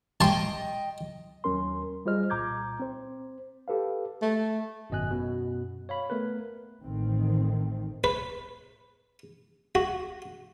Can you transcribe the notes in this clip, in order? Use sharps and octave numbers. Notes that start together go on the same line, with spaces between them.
D#5 G5 A5 C6
D#2 F#3 C#4 A#4 C6
G3 F4 G#4 C5 D#5 F6
C2 A#2 A#5 D6 G6 G#6
C4 C5
G4 A4 B4 F5
A3
G#1 F#2 B2 D#5 G#5 F#6
F#2 B2
C#5 F5 B5
A3 B3 A#4 B4
A1 D#3 E3 A3 C4
B4
F#4